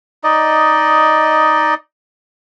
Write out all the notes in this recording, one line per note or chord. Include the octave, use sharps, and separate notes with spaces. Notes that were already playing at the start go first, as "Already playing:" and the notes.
D#4 D5 D#5